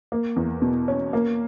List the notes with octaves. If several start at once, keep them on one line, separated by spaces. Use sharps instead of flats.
A#3
E2
B2
C#4
A#3